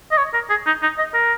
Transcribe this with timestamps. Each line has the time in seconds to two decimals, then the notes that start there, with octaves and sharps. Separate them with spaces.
0.11 D#5
0.18 C#5
0.34 A#4
0.50 G#4
0.66 D#4
0.82 D#4
0.98 D#5
1.14 A#4